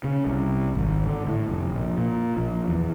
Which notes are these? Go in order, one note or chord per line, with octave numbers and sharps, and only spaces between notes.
C#3
C2
G#1
D3
A2
F1
A#1
A#2
A#1
E2